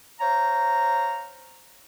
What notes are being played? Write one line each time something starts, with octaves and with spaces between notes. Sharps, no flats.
C5 C#5 F5 A#5